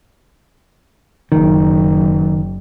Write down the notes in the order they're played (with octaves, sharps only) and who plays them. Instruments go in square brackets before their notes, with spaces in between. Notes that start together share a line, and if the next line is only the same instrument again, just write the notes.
[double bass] F#1 [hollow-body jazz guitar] D#3